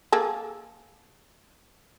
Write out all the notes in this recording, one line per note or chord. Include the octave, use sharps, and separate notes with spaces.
A#3 G#4 A4